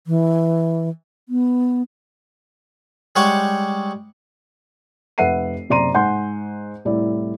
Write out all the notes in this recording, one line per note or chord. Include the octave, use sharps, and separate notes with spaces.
E3
B3
G3 G#3 G4 C#5 F#5 C#6
F1 B4 E5 F#5 C7 D#7
F#1 C3 D5 A#5 C6 D#7
G#2 F#5 G#5 C6 G6
C2 A2 E4 D5